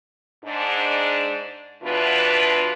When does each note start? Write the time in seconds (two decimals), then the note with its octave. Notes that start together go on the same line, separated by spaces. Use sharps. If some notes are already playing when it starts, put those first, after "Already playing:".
0.43 G#2 D4
1.82 E2 B2 E3 D4 F4 B4